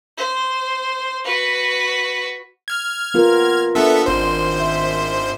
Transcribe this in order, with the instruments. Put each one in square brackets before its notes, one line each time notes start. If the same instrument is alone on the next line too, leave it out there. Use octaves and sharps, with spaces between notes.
[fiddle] C5
F#4 B4
[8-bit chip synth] F6 G#6
[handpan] B3 F4 A#4
[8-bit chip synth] B3 A4 E5 [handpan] D4
[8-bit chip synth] G#1 C5
[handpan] E5